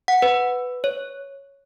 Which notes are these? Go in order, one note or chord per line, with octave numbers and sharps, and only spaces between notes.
F#5
B4
C#5